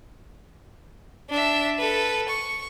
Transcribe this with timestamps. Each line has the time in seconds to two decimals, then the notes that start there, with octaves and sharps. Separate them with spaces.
1.30 D4 E5
1.79 A4 B4
2.29 C#6